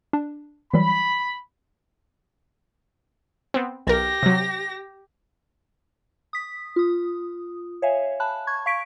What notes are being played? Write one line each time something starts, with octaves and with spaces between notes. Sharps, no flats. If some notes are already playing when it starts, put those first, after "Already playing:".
D4
E3 F#3 G3 B5
B3 C4
B1 G4 A#4 A#6
C3 F#3
D#6 B6
F4 D#6
C#5 E5 F5 G#5
A5 B5 F#6
C#6 G#6
F5 C#6 B6 D7